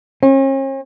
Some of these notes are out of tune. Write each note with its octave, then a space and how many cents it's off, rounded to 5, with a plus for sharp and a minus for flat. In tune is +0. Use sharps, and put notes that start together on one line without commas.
C#4 -45